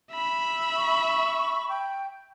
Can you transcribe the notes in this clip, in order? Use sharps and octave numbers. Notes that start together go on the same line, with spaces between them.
E5 B5
C#6
G5